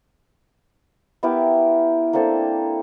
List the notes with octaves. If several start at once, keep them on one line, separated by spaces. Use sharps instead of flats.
B3 E4 G4 A#4
A#3 C4 D4 A4